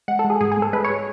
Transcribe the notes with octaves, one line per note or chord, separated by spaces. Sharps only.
G#3 F#5
A4
G#3
G#4
G#2 G#4
G#4
G#2
A4
G#3 B4
C#5
G#3